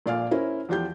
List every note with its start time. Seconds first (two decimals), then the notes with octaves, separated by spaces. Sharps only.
0.06 A#1 A#2 D5 F5 G#5 F6
0.31 C#4 E4 A#4 C5
0.69 E2 F3 F4 G4 G6